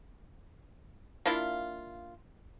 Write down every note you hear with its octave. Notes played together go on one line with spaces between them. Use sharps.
A#3 D4 E4 F4